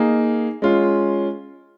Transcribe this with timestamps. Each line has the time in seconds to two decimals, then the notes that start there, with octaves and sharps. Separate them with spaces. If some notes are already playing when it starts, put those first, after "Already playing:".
Already playing: A#3 D#4 G#4
0.62 G#3 C#4 F4